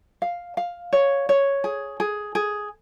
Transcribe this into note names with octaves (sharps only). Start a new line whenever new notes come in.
F5
F5
C#5
C#5
G#4
G#4
G#4